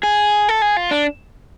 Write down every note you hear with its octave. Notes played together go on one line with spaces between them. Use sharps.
G#4
A4
G#4
F4
D4